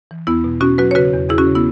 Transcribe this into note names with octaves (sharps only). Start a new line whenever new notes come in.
E3
E2 B3 E4
B2
B2 C#4 F#4
F#3 F#4 B4
C#5
C#3 F#4 B4
E2
E2 E4 G#4
C#4 F#4
C#3
B3 E4